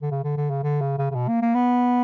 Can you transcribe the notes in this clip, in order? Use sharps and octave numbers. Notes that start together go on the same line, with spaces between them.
D3
C#3
D3
D3
C#3
D3
C#3
C#3
C#3
B2
A#3
A#3
B3